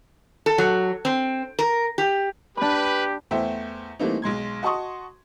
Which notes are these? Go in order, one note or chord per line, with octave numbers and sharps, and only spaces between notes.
A4
F#3
C4
A#4
G4
D4 G4 B4 B5
E2 A3 C5 E5 G5
E3 G3 A3 A#3 C4 D#4
B1 G#3 C6 G#6
F#4 D#5 A5 C6 C#6 D#6